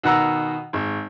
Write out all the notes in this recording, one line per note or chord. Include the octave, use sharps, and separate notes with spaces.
B2 D#3 F#5 A#5 E6
G#1